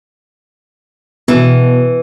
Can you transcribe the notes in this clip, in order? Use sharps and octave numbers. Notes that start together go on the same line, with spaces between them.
B2 E3